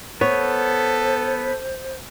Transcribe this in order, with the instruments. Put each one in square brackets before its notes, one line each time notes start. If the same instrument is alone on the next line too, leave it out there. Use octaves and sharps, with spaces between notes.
[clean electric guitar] B3 [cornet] A4 [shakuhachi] C5 [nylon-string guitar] C#5